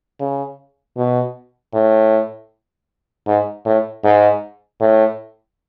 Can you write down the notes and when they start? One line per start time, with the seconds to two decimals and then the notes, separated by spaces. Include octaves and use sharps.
0.20 C#3
0.97 B2
1.74 A2
3.27 G#2
3.65 A2
4.04 G#2
4.81 A2